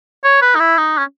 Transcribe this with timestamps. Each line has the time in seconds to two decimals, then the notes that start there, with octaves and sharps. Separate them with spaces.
0.24 C#5
0.42 B4
0.55 D#4
0.59 E4
0.78 D#4
0.98 C#4